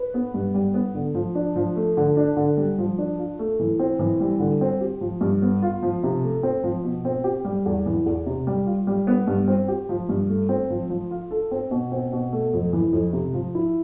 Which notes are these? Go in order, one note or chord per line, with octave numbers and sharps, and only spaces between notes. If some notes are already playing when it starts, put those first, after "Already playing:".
Already playing: B4
B3
G2
G3
B3
D3
F3
D4
F3
A3
D3
D4
D3
G3
F3
D4
F4
A3
E3
C4
E3
G3
D3
C4
G4
F3
G2
B3
F4
F3
C3
A3
C4
F3
B2
C4
G4
G3
E2
E3
E2
C3
G3
F4
G3
B3
G2
C4
G4
F3
G2
A3
C4
F3
F3
F4
A4
C4
B2
C4
B2
A3
F2
E3
F2
C3
F3
E4